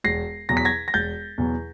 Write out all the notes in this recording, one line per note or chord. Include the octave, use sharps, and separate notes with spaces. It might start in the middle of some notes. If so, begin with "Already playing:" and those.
E1 A#6 C7
E2 B2 F#3 A#6
B6
G#6 A#6
A#6
E1 G6 A6
E2 B2 F#3